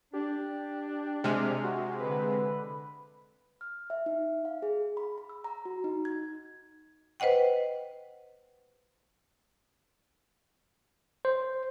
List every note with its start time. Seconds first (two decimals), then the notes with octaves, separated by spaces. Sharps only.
0.13 D4 G4
1.24 C3 G#3 F6
1.64 F#4
2.00 D3 B4
3.61 F6
3.90 E5
4.06 D#4
4.45 F5
4.62 G#4
4.97 B5
5.18 B5
5.29 E6
5.44 A#5
5.65 F#4
5.84 D#4
6.05 G#6
7.20 B4 C5 D#5 F#5 G5
11.25 C5